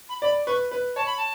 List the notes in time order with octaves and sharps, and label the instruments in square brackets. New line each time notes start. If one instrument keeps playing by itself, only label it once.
[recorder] B5
[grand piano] D5 [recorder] B5
[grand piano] B4 [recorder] C#6
[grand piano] B4
[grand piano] C#5 [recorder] A5
[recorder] B5
A5